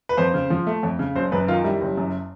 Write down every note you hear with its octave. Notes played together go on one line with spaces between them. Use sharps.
B4
F2 C5
C#3
F3
A3
F2
C#3
F#1 C5
F#2 B4
D#3 F4
G3 E4
F#1
F#2